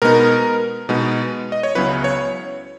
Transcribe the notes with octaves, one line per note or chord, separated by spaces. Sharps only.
B2 G#3 B3 D#4 A#4
B2 G#3 B3 D#4
D#5
C#5
C#2 C#3 F#3 B3 E4 B4
C#5